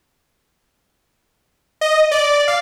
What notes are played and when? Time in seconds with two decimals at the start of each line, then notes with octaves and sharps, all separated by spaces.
1.81 D#5
2.11 D5
2.48 F5